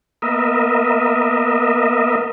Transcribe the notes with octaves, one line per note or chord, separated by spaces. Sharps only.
A#3 B3 A#4 D#5 E5